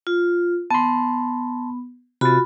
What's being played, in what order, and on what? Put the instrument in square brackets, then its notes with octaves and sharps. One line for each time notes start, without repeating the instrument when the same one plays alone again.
[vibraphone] F4
[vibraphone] B3 [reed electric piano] A5 C6
[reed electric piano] C3 A6 [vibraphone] F4 F#4 B5